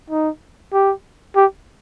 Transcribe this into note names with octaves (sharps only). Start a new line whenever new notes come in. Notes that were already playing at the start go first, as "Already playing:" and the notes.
D#4
G4
G4